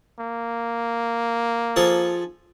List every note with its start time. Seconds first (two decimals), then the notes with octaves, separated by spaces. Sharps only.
0.20 A#3
1.76 F3 G#4 A4